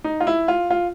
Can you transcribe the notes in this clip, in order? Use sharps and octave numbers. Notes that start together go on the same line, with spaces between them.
D#4
F4
E4
F4
F4